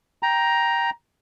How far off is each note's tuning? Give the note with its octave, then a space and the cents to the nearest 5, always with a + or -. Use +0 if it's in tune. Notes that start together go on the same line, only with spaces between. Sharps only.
G5 +0 A#5 +10